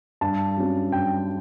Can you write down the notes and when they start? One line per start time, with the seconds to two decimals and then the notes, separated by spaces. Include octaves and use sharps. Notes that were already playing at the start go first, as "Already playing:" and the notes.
0.21 G2 A5
0.57 F#3 C#4
0.92 G2 G5